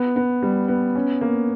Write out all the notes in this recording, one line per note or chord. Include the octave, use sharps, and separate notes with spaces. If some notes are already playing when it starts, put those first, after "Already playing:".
Already playing: B3
B3
G3
B3
C#4
A#3